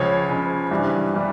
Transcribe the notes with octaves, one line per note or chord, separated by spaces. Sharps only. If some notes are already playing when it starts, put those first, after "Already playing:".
Already playing: C#2 C#3 F3 C#5
C#2 C#3 F3
G2 E3 G3
E3 G3